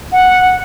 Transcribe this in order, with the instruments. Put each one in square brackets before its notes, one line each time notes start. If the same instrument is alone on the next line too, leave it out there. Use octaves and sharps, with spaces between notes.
[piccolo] F#5